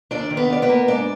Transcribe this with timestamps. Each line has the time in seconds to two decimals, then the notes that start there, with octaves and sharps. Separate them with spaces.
0.11 D#2 D4 D5
0.30 D#3
0.37 B3 B4
0.50 D#2 D5
0.62 B3 B4
0.69 A#3
0.87 G#2 D4 D5